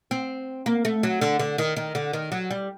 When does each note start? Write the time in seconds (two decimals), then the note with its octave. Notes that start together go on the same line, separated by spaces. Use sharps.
0.11 C4
0.66 A#3
0.85 A3
1.03 F#3
1.21 D3
1.39 D3
1.58 D#3
1.77 D#3
1.95 D3
2.13 D#3
2.32 F#3
2.51 G3